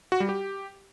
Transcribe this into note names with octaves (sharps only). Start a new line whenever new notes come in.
F#4
G3
G4